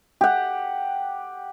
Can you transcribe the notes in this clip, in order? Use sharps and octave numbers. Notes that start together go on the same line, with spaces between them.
G4 F#5